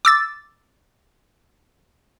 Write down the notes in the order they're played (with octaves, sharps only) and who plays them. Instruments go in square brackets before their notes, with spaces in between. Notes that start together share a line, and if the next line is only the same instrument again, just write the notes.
[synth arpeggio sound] D6 E6 A6